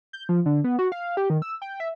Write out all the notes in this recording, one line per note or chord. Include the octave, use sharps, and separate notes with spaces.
G6
F3
D3
B3
F#4
F5
G4
D#3
E6
G5
E5